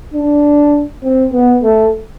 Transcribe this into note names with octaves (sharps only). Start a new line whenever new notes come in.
D4
C4
B3
A3